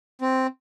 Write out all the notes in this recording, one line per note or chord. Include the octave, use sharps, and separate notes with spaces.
C4